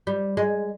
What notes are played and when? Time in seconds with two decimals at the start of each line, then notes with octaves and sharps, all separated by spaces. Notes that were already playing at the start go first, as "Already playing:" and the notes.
0.07 G3
0.37 G#3